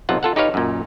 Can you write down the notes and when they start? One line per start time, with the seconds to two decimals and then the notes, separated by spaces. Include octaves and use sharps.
0.09 B1 C3 F4 F#5
0.23 F4 A4 F#5
0.36 D#4 G4 B4 C#5 F5
0.54 F#2 A#2